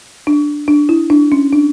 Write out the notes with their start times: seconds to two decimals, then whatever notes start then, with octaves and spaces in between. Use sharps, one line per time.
0.27 D4
0.68 D4
0.89 E4
1.10 D4
1.32 C#4
1.53 D4